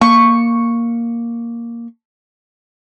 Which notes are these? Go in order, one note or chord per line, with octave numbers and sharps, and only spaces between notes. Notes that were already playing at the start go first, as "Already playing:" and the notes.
A#3 C#6